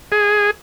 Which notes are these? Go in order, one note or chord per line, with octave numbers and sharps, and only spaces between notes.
G#4